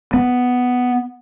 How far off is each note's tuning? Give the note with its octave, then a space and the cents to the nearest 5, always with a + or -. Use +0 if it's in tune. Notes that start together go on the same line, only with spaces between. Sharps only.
B3 +5